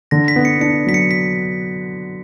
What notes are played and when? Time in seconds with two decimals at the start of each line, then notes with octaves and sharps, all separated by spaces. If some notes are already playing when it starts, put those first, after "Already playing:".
0.11 D3 A#6
0.28 B6
0.36 B3
0.45 C#7
0.61 D4 C#7
0.86 F#3 B6
0.94 C#7
1.11 B6